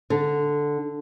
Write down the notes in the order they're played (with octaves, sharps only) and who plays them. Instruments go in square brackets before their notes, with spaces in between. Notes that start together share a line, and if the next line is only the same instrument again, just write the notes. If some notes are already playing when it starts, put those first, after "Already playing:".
[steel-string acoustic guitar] D3